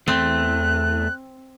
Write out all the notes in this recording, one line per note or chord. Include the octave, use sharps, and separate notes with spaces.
E2 A3 C4 F#6